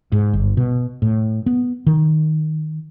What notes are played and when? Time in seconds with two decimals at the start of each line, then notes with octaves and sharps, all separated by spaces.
0.12 G#2
0.33 G1
0.57 B2
1.02 A2
1.46 B3
1.86 D#3